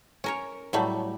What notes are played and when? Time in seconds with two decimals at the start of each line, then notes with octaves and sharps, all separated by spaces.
0.24 C#4 A#4 C#5
0.73 A2 F#3 G3 A3